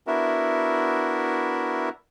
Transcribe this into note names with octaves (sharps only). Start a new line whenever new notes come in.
B3 D4 E4 F#4 A#4 E5